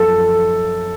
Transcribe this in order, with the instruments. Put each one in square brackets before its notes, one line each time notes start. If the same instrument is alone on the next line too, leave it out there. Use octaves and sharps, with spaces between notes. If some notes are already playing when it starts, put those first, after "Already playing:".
Already playing: [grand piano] F#2 F3 A4